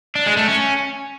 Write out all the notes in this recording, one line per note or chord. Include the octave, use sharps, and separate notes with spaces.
D4
G#3
A3
C#4